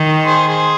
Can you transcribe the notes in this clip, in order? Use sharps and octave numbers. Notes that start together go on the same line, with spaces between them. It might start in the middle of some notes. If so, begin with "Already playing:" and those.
Already playing: D#3
G#4 C5
G#4 C5